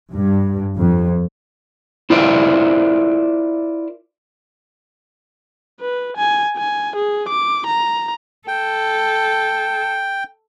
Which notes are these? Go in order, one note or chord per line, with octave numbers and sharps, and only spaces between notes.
G2
F2
E4 F4 A#4 C5 D5 E5
B4
G#5
G#5
G#4
D6
A#5
A4 G5